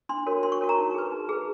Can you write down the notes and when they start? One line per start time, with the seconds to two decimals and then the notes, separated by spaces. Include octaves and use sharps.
0.09 D4 C6
0.26 F#4 A#4 C#5
0.43 D4 C6
0.52 C#6
0.61 F#4 A#4 C#5
0.69 A#5
0.78 D#4
0.94 G#4 B4
1.12 D#4
1.29 G#4 B4